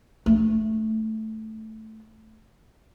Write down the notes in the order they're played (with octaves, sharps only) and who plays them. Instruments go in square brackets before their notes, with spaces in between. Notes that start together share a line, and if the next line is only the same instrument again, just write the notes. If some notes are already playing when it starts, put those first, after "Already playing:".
[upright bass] A3 D4